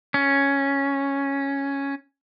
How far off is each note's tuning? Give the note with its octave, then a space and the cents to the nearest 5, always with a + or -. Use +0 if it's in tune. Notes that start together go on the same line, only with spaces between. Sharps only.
C#4 +0